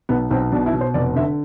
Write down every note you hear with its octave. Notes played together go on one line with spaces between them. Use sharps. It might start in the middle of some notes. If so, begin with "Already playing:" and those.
B1 B3
B1 C4
B2 D4
E4
B2
C5
F1 D5
D3 E5